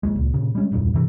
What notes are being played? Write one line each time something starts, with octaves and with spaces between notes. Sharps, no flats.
G#1 D#2 G#3
C#2 A#2
A#2 C#3
G3 G#3 C#4
D1 E2 G2 A#2
G2 C3 E3